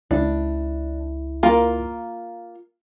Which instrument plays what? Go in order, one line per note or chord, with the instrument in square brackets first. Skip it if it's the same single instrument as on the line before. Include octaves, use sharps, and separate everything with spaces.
[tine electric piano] C#2 E4 [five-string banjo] D4
[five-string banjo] A#3 F4 A#4